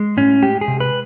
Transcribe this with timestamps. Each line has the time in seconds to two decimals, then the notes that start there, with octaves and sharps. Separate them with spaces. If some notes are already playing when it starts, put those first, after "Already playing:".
Already playing: G#3
0.17 A2 C#4
0.42 G#3 G4
0.61 G#4
0.68 C3
0.80 B4